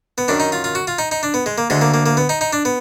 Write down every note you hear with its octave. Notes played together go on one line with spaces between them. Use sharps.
B3
F#2 D#3 D4
D#4
F4
F4
F#4
F4
D#4
D#4
D4
B3
G#3
A#3
D2 D3 G#3
A#3
A#3
A#3
B3
D#4
D#4
D4
B3